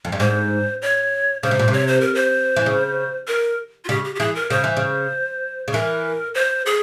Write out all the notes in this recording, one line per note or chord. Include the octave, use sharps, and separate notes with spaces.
F2
G2
G#2 C5
C#5
C#3 C5
C3
A#2
C3
C#5
C5
A#4
C5
E3
C#3
A#4
F4
C#3 G4
G4
G4
E3 G#4
A#4
C#3 C5
E3
C#3
C#3
E3 A#4
C5
G#4